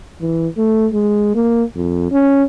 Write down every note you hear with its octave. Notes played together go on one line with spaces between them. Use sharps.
E3
A3
G#3
A#3
F2
C#4